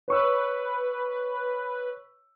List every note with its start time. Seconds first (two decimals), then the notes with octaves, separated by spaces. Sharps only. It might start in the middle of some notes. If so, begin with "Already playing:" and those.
0.08 B4 C#5 C#6 E6